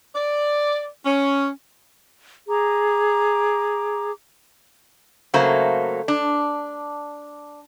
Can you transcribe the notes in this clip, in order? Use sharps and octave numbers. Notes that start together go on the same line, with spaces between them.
D5
C#4
G#4 A#5 D6
C#3 F#3 A3 A#3 C5
D4